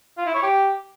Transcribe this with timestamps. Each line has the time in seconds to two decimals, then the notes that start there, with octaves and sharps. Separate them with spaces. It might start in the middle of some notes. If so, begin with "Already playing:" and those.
0.17 F4
0.26 E4
0.34 C#5
0.43 G4